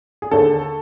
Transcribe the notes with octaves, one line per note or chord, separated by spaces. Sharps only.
G#4
D#2 D3 A4